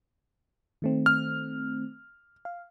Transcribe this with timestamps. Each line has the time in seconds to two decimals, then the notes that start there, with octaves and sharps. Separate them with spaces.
0.82 D#3 A3 C4
1.06 F6
2.45 F5